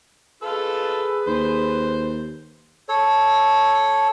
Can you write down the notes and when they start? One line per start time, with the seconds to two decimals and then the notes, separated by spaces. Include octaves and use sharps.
0.42 F4 G#4 A4 B4 E6
1.27 D#2 C5
2.89 A4 C#5